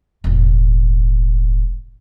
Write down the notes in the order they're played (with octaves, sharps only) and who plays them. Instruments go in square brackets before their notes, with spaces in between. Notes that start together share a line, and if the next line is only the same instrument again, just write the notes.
[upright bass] E1 A1